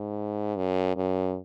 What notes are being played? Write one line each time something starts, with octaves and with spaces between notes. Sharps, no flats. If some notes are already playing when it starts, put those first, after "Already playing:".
Already playing: G#2
F#2
F#2